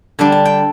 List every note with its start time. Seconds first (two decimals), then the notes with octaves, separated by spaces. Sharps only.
0.19 D3 G3 D4 A5
0.32 A5
0.45 G5